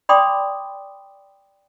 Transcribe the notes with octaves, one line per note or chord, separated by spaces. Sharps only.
D5 G5 B5 C6 D6 D#6